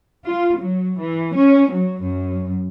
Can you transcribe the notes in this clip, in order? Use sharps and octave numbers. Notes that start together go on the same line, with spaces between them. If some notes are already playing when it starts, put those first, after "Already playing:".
F4
F#3
E3
C#4
F#3
F#2